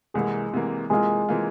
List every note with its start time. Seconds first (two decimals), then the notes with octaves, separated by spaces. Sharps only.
0.14 C2 C3 E3 G#3 A#3 G#4
0.53 C2 C3 E3 A#3
0.90 C3 E3 G#3 A#3 F4 G#4
1.29 C3 E3 A#3 F4